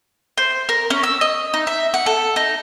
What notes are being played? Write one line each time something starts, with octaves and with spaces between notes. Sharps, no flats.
C5
A#4
C#4
E6
D#5
D#4
E5
F#5
A4
D#4